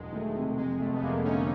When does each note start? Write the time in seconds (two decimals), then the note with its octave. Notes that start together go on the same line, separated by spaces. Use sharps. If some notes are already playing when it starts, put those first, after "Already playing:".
Already playing: E1 E2 F#3 G#3
0.12 D#3 A3
0.27 G#3
0.35 C3
0.42 A3
0.57 F2 G#3
0.79 F1 A3
0.94 B3
1.02 F1 G#3 A#3
1.24 D3 C#4 D#4